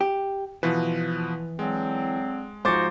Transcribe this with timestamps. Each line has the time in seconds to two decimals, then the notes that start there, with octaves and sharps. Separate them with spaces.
0.01 G4
0.63 B2 E3 F3 B4
1.59 D3 F#3 G#3 C4
2.65 G#2 F3 D#4 F#4 C5 D6 A6